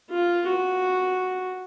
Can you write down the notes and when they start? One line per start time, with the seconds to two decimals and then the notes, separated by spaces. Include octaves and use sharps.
0.10 F4
0.47 F#4